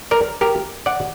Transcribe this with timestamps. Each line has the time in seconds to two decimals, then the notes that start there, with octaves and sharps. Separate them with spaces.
0.11 A#4 D5
0.41 G4 A#4
0.86 D5 F#5